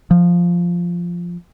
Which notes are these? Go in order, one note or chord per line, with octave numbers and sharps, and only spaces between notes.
F3